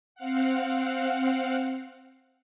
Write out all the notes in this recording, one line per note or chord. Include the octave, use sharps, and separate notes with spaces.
C4 F5 F#5